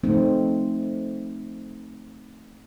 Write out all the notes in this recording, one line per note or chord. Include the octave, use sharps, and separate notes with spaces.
F3 A3 C4 D#4